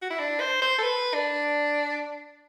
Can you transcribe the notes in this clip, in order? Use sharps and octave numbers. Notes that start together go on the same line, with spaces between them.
F#4
E4
D4
C5
C5
A4
B4
D4